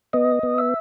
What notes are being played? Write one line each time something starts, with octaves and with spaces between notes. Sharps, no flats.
B3 D#5
B3
E5